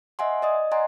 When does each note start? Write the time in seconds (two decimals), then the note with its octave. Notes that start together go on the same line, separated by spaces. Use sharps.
0.19 D#5 E5 F#5 G#5 C6
0.42 D5 D#5 D#6
0.71 D5 D#5 F#5 G#5 A#5 C6